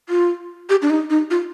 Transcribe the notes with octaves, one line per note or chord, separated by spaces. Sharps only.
F4
G4
D4
D#4
D#4
F4